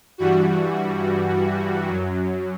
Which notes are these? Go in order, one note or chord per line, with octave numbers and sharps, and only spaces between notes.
G2 E3 G3 F#4
F#2 F#3